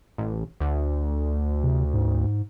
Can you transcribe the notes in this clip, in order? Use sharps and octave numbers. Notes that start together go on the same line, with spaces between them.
A1
D2
C3
G#2